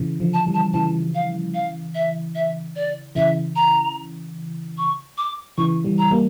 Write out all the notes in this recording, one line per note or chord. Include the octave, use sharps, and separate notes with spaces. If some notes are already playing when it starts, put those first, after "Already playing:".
Already playing: C#3 E3
D3 F3
A5
E3 G3
A5
C#3 E3 A5
F5
F5
E5
E5
D5
C#3 E3 E5
A#5
C#6
D6
C#3 E3 C#6
E3 G3
A#5
G3 A#3